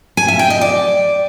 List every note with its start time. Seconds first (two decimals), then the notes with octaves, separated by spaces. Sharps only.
0.17 G#5
0.28 E5
0.39 G5
0.50 D#5
0.61 D5